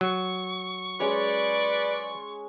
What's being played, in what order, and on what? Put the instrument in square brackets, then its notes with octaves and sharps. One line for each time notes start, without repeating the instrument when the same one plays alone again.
[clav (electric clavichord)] F#3 [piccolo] C#6
[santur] G#3 C#4 C#5 [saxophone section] B4 D5